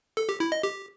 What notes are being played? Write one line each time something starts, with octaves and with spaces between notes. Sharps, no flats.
A4
G4
E4
D#5
G4